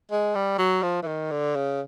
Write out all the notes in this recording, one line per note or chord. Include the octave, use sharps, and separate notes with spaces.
G#3
G3
F#3
F3
E3
D#3
D3
C#3